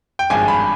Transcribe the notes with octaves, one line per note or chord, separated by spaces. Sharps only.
G5
G#1 G2 F3 G#3 G#5
B5